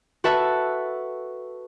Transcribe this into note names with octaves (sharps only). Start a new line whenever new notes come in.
F#4 A4 B4 E5 A5